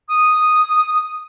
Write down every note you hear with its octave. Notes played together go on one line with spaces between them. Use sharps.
D#6